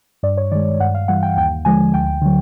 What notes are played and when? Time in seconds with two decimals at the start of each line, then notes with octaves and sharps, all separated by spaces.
0.23 G2 D5
0.37 C#5
0.52 D#3 D5
0.55 G#3
0.80 G2 F#5
0.95 F5
1.08 E3 G3 F#5
1.23 G5
1.37 D#2 G5
1.65 D3 F3 G#3 G#5
1.94 D2 G5
2.22 D3 F#3